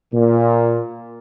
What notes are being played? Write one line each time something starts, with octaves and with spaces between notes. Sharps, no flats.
A#2